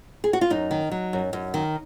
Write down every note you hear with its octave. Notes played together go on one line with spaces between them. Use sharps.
G#4
F#4
F4
F#2 D#4
D#3
F#3
F#2
F#2
D#3